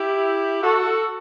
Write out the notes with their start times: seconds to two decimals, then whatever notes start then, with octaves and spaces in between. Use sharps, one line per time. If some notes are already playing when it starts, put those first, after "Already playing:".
Already playing: E4 G4
0.62 F#4 A4